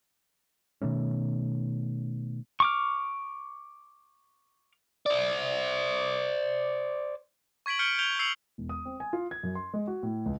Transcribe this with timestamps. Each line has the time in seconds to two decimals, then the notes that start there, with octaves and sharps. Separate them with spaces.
0.81 B2 D#3 A3 C#4
2.60 C#6 D6 F6
5.06 C5 D5
7.66 C#6 G#6 B6 D7 F#7
7.79 F6 G6 C#7 D7 G7
7.99 G6 F7 G7
8.19 E6 C7 C#7 F7 F#7
8.58 E1
8.69 D#6
8.85 C4
9.00 G#5
9.13 F4
9.31 G#6
9.43 F#2
9.55 C6
9.74 G#3
9.87 F#4
10.03 A2
10.26 C#2